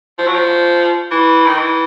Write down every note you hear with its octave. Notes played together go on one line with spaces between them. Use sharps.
F3
F#3
F3
E3
D#3
E3